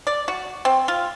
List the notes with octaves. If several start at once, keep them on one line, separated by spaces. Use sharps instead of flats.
D5
F#4
C4
F4